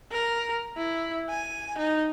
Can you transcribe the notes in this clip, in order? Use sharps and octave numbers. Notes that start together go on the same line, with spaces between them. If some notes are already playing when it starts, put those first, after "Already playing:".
A#4
E4
G#5
D#4